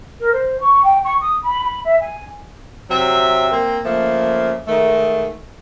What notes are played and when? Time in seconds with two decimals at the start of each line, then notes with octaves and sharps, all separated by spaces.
0.19 A#4
0.32 C5
0.60 C#6
0.83 G5
1.04 C#6
1.20 D#6
1.42 B5
1.63 B5
1.84 E5
2.00 G#5
2.90 C3 F#3 C4 E5
3.52 A#3 C4
3.86 C#3 F3 A3 A#3
4.68 G#2 D#3 A3